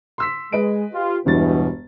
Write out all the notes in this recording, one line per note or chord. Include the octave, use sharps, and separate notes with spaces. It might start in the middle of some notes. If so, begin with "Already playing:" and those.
C6 E6 B6
G#3 B4 D#5 D7
F4 G4
E1 G2 B2 E3 A6